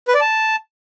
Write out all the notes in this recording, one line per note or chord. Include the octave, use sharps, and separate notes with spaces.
B4
D5
A5